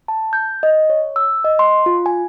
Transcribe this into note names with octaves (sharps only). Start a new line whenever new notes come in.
A5
G6
D#5
C#5
E6
D#5
C6
F4
G#5